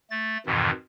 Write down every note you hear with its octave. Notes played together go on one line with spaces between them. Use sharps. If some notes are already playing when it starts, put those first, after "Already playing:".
A3 A6
F2 G#2 B2 D#3 E3